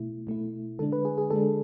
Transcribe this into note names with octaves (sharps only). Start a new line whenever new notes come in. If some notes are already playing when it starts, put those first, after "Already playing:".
Already playing: B2 A3 E4
B2 A3 E4
D3 G#3 D4 A4
B4
G#4
G#4
D3 G#3 D4 A4